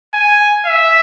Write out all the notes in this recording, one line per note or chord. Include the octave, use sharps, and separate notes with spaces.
G#5
E5